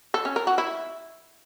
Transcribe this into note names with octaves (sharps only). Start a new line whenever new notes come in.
A4
C#4
A#4
F#4
E4